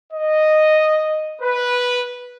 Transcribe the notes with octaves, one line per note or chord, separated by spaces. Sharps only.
D#5
B4